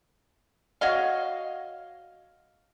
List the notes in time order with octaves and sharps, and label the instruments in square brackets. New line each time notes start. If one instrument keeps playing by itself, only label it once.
[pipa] F#4 C#5 D#5 F5